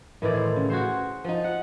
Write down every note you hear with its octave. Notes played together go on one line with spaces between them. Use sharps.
A2 D#3 E3 D5
C5
C#3
F#4 G#4 C5
F3 D#4
F#5